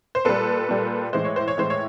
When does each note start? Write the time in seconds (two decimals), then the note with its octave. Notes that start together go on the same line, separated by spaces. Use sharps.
0.15 C5
0.25 A#2 G3 A4 B4
0.69 A#2 G3
1.13 A2 E3 G#3 C5
1.24 C#5
1.36 C5
1.48 C#5
1.57 A2 E3 G#3 C5
1.70 C#5